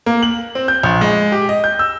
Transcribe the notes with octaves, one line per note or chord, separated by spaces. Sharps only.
A#3
F#7
C4
G6
A#1
G#3
G4
D#5
G6
E6